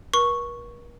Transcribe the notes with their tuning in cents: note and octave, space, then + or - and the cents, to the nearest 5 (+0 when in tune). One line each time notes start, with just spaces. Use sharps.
A#4 +45 C#6 +0